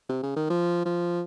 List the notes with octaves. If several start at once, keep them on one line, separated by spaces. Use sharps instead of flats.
C3
C#3
D#3
F3
F3